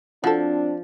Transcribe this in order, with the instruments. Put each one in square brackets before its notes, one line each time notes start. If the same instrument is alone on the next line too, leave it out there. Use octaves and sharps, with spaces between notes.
[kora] F3 [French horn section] C4 D4 [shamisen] F#4 A4